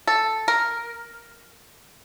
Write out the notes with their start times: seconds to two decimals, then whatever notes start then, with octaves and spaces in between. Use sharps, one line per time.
0.07 A4
0.48 A#4